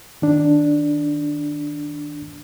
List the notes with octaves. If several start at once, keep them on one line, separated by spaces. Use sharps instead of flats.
D#3 D4